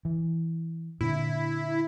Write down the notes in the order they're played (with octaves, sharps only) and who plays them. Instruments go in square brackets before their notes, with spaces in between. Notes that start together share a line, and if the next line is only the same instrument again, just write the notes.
[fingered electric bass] E3
[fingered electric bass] A#2 D3 [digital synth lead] E4